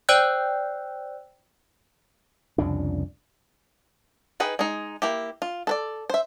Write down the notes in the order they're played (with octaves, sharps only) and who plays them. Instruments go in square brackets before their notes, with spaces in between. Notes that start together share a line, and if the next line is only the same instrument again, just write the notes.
[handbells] C5 D5 G5 E6 F#6 G6
[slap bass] C2 F2 C#3 D4
[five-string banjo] D#4 G#4 B4 G5
G#3 D#4
A#3 E4 G4
F4
A4 B4 D5
C5 E5